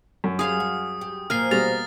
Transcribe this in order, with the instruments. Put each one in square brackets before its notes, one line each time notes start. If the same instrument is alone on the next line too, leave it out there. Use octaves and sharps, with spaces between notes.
[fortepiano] F#2
[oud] G3 G#3 C#4 [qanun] G#4 F5 [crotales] D#6
[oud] F#4
G4
[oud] A#2 F3 [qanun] A#3 G#5 [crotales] F6 C7
[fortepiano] B2 G3 G#4 [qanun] A#5 [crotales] A6